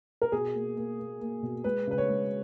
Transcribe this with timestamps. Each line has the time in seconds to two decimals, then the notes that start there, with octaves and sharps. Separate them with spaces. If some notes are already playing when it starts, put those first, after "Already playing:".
0.22 A#4
0.32 B2 G#4
0.55 A#3
0.77 A#3
0.99 A#3
1.21 A#3
1.43 B2
1.64 G#3 B4
1.87 C#3 B4
1.98 C#5
2.09 G#3